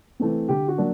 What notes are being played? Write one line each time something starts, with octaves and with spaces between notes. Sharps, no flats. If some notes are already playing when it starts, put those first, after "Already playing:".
E3 A3 C4
D3 G4
F#4
F#3 A#3 D4